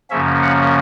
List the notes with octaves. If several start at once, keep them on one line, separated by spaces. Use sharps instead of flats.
F#2 C#3 F3 A#3 C#4 E5
F#5